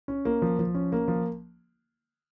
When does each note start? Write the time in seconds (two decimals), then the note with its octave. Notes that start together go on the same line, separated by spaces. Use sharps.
0.08 C#4
0.25 A#3
0.42 F3
0.59 F3
0.75 C#4
0.92 A#3
1.08 F3